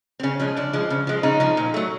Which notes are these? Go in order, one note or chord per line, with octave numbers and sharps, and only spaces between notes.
C4
C#3 C#4
F3 G#3 C#4
C#3 D4
F3 G#3
C#3
F3 G#3
C#3 D#4
F3 G#3
A#2
F#3 A3